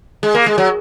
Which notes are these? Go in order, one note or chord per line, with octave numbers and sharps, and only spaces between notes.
G#3
A#3
G#3
F#3